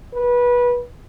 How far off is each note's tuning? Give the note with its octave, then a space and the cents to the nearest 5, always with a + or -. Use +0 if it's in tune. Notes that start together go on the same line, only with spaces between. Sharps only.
B4 -20